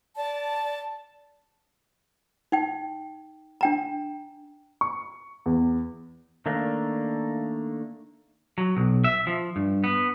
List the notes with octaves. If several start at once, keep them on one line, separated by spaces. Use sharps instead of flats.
D5 A5
D#4 G5
D4 G5 A#5
C#6
E2
D#3 A3 A#3 D4
F#3
B1
E5
F3
G2
B3